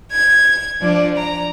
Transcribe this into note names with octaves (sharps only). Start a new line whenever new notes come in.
G#6
F3 D4 D5
A#5